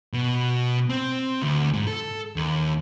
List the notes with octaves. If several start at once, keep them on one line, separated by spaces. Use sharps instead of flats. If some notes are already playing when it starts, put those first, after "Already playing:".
B2
C4
D2
G#2
A4
D#2